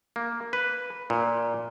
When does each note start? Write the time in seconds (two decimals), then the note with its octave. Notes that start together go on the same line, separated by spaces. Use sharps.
0.16 A#3
0.53 B4
1.10 A#2